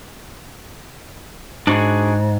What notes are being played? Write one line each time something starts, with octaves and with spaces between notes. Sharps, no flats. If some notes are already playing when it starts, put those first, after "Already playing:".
G#2 D4 F#4 G#4